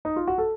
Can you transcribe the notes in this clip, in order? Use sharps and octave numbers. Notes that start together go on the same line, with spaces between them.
D#4
F4
F#4
A4